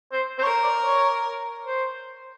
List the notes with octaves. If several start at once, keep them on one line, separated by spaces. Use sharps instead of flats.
C5
C5
A#4 C#5
D5
C#5
C5